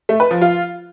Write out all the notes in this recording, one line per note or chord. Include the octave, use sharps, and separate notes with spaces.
A3
B4
F3
F4